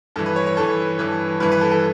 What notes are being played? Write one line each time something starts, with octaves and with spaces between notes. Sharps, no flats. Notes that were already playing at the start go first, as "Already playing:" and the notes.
G2 E3 A4
B4
C#5
C#5
G2 E3 A4
G2 E3
G2 E3 B4
B4
A4
A4